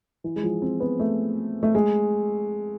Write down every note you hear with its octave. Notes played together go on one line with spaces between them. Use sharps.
E3
G#3
F3
C4
B3
A3
A3
G#3